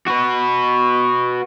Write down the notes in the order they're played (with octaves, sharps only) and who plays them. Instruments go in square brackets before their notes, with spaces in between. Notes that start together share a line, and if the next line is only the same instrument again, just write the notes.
[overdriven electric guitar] F#4 B4